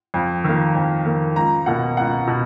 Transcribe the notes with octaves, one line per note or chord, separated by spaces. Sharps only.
F2
D#3 A#3
F2
D#3 A#3
C#2 A#5
B2 A#3 F#5
C#2 F#5
B2